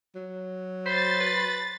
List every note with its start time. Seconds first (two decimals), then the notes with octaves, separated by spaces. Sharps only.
0.15 F#3
0.86 C5 B5 C6 A6
1.20 B4